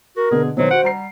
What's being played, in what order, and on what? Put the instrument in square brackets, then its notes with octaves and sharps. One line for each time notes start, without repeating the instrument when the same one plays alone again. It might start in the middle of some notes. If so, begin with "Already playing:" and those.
[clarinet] F#4 [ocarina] A#4
[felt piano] B2 D3 [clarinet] G#4
[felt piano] B2 D#3 [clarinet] F#3 [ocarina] C5
[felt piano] F#4 D7 [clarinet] F#5
[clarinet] G3 [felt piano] F#5 A#5 C7